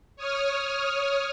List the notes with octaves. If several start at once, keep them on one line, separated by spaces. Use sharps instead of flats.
C#5 D#6 F6